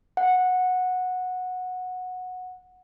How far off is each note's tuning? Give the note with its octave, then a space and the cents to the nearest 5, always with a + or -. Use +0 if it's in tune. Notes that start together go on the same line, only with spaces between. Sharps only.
F#5 -10